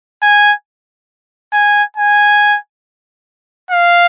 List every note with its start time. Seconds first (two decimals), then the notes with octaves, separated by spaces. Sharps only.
0.22 G#5
1.53 G#5
1.97 G#5
3.71 F5